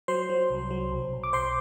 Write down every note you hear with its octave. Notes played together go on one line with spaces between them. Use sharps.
F#3 C5 C6
F#3
C2
F#3
B1
B1
D6
B1 C5 C6